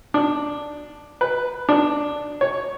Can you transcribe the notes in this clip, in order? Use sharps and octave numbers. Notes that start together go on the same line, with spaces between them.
D4
B4
D4
C#5